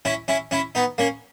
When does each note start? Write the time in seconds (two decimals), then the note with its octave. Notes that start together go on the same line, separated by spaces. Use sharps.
0.05 C#4 E4
0.28 C#4 E4
0.51 C#4 E4
0.75 B3 D#4
0.98 A#3 C#4